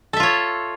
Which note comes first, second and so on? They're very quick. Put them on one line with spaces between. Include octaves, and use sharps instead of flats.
A4 E5 F4 C#5